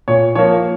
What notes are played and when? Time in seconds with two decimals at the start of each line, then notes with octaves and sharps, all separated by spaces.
0.08 A#2 C#5
0.35 F3 A#3 C#5